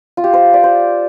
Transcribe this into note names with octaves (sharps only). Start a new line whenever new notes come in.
F4
G4
C5
D5
C5